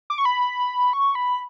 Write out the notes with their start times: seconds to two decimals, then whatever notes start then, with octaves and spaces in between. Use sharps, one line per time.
0.10 D6
0.18 C#6
0.25 B5
0.93 C#6
1.15 B5